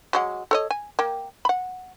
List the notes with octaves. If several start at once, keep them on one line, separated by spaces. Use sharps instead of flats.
F#3 G#3 F#5
A4 C#5 D#5
G#5
A#3 G5
F#5 B5